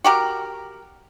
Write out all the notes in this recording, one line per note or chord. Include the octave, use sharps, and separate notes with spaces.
F#4 G4 A#4